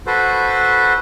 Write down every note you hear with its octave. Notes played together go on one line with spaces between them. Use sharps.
F#4 A4 B4 C5